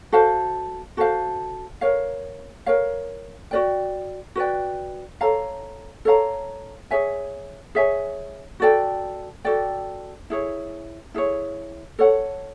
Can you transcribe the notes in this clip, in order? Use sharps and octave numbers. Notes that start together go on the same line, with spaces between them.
F#4 A4 C5 F5
F#4 A4 C5 F5
A#4 C#5 F5
A#4 C#5 F5
F#4 B4 D5 G5
F#4 B4 D5 G5
A4 C#5 F5 A#5
A4 C#5 F5 A#5
G#4 C#5 E5 G#5
G#4 C#5 E5 G#5
F#4 A4 D5 G5
F#4 A4 D5 G5
E4 G#4 C#5
E4 G#4 C#5
A4 C#5 F#5